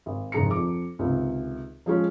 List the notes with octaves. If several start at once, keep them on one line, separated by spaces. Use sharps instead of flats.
G#1
F1 G#2 D#3 G#4 A#5 C#7
F2 D6
C#2 C3 D#3
F3 G#3 C#4